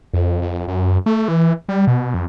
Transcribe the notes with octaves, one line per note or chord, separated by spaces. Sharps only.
F2
F2
F#2
A3
E3
G3
B2
F2